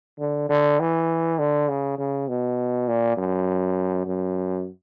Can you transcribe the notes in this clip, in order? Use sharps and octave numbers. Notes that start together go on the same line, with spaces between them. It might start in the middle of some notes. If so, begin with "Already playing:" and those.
D3
D3
E3
D3
C#3
C#3
B2
A#2
F#2
F#2